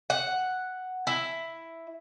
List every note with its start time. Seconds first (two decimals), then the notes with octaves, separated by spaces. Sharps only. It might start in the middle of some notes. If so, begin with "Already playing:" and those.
0.10 F#5
1.07 E4